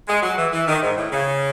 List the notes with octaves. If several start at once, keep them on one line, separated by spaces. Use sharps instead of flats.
G#3
F#3
E3
E3
D#3
G#2
A2
C#3